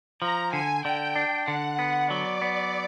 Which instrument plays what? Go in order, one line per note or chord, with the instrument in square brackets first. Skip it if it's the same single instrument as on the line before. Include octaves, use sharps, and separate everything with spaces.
[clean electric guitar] F3 [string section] A#5
[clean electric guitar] D3 [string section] G#5
[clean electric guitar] D3 [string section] G5
[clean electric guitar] D4
[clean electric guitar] D3 [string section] F#5
[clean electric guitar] B3
[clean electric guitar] F#3 [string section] D5
[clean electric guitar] B3